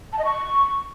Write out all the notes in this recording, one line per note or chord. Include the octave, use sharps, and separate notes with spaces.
A5
D#5
C#6